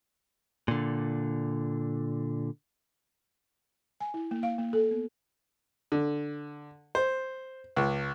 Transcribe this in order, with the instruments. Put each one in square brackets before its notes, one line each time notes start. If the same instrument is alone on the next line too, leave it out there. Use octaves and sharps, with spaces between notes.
[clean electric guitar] A#2 D3
[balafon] G#5
E4
A#3
F5
A#3
A4
B3
[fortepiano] D3
C5
C#2